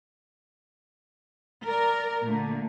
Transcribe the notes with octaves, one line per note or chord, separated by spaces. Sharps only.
A#4 D5
A#2 D3 A3